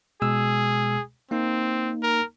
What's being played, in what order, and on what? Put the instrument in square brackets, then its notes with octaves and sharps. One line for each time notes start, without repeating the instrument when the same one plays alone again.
[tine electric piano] B2 G#3 E6 [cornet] G#4
[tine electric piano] A#3 D#4 [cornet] C4
[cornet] A#4